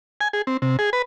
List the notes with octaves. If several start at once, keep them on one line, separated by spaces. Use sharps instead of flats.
G#5
G#4
C4
C3
G#4
B4